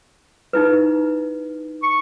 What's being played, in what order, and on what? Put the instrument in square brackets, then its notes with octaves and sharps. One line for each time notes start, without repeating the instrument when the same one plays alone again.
[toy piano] D#4 E4 B4
[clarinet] C#6